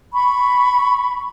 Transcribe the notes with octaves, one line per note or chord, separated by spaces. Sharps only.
B5 C#6